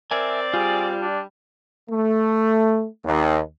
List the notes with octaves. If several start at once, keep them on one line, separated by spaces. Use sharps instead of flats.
C4 A#4 D5 E5 G#5
G3 F4 G#4
D4
A3
D#2